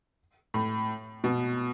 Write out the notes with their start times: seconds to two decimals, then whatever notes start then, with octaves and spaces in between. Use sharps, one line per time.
0.54 A2
1.24 B2